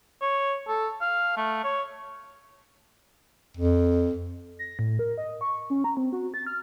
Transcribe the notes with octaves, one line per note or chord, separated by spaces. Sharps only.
C#5
A4
F5
A3
C#5
F2
A#6
A2
A#4
D#5
C#6
C#4
A#5
C4
F#4
A6
F6